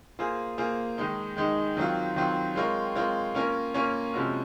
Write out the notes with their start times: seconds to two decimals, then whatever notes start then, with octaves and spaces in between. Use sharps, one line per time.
0.19 A#3 F4 G#4 C5
0.58 A#3 F4 G#4 C5
0.98 D#3 G#3 D#4
1.37 D#3 G#3 D#4
1.77 D#3 F#3 C4 F4
2.16 D#3 F#3 C4 F4
2.55 G#3 C4 F4 A#4 C#5
2.96 G#3 C4 F4 A#4 C#5
3.35 A#3 C#4 F4 A#4 C#5
3.74 A#3 C#4 F4 A#4 C#5
4.14 C3 F3 G#3 C#4 F#4